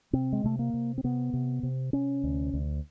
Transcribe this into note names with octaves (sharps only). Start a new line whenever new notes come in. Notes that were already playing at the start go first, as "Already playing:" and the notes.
C3 C4
G#3
C3 A3
A#3
C3
C4
C3 B3
C3
C3
C3 C#4
D2
D2